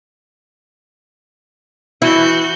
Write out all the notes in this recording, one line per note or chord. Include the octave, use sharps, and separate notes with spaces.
E3 E4 F#4 G6